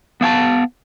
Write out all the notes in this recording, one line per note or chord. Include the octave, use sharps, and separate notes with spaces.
B3 F5 G#5 A5